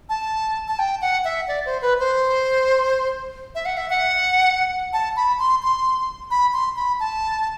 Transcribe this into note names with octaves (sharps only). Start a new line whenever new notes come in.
A5
A5
G5
F#5
E5
D5
C5
B4
C5
E5
F#5
E5
F#5
A5
B5
C6
C6
B5
C6
B5
A5